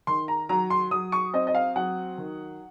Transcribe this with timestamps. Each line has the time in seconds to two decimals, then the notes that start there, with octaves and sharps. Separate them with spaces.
0.07 D#3 C6
0.28 A#5
0.49 F#3 A#5
0.70 C6
0.91 F#3 D#6
1.12 C#6
1.33 C4 D#5
1.47 D#5
1.55 F5
1.76 F#3 F#5
2.18 D#3